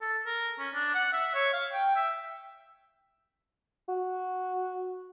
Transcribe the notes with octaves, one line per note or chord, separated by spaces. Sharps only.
A4
A#4
C#4
D4
F#5
E5
C#5
F5
G5
E5
F#4